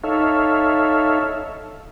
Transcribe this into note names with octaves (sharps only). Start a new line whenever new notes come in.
D#4 A4 C#5 E5 F5